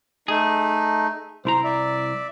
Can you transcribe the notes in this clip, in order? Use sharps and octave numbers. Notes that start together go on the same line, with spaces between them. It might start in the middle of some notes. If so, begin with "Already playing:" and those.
A3 D#4 G#4
C2 E4 C5 A#5
D5 E5